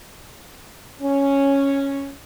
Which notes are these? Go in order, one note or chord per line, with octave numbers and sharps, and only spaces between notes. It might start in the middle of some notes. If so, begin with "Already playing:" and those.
C#4